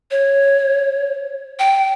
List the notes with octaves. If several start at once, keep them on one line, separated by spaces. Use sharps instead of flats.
C#5
G5